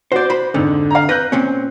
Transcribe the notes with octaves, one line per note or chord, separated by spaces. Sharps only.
F#4 C5 D5 G6
C5 B5
F2 G#2 D3
F5 A#5
B4 F#6 G6 A#6
A#2 C4 C#4